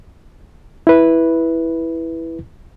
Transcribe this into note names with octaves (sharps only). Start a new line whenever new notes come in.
E4 B4